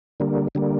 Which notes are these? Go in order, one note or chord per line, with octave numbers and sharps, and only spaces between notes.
D3 G3 A#3
D3 G3 A#3